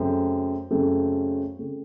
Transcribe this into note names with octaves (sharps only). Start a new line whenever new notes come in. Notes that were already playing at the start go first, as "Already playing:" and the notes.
Already playing: F#2 C#3 A3 C4
F#2 C#3 A3 C4
C#3 A3 C4